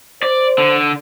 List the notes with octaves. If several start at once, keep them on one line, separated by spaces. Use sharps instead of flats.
C5 D5
D3